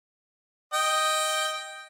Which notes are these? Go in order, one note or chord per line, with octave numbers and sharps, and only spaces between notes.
D#5 G5